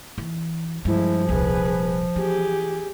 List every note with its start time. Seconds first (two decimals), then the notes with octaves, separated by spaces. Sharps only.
0.18 E3
0.85 G2 F3 G#3 E4
1.29 D#1 C2 G#4 B4
2.16 E3 G4 G#4